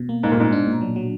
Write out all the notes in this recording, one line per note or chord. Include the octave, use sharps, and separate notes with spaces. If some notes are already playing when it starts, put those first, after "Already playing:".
Already playing: B2
A#3
G#2 A#3
A#2
G#2 B2
D4
A#2
F#3
F#3